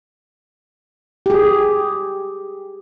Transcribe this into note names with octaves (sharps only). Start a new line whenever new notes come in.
G4 G#4